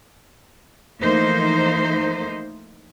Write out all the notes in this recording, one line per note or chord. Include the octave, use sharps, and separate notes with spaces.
E3 F3 A3 A#3 D#4 C5